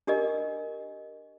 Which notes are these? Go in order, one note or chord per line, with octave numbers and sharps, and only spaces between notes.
D4 G4 A#4 D#5